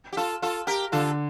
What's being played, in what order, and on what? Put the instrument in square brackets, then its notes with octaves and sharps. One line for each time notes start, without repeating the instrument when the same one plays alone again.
[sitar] G4
F4 A4
F4 A4
G4 A#4
[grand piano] D3 [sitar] F4 A4